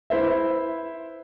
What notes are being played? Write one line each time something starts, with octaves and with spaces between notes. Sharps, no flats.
E4 B4 C5 E5